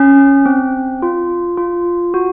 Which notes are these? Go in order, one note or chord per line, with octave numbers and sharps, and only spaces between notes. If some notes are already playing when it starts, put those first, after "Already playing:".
Already playing: C#4
C4
F4
F4
F#4